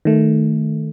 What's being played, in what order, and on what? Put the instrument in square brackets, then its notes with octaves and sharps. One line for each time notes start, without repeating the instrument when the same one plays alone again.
[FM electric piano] D#3 A3